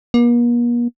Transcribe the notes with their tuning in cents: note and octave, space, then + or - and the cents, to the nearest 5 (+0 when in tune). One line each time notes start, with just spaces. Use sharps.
A#3 +45